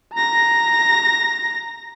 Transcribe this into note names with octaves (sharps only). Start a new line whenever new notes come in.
A#5 A#6